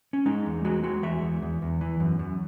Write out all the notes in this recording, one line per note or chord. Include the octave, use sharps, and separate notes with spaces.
C#4
G#3 D#4
E2
G#3 F#4
G#3 F#4
E2 E5
E2
E2
E2
E3
F#2
F#2